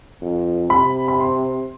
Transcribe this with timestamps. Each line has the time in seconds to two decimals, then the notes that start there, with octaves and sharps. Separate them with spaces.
0.22 F2
0.70 C3 B5
1.08 B5
1.19 C6